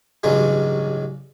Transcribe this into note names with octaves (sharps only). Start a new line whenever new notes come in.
A1 G2 C#3 F#3 G#3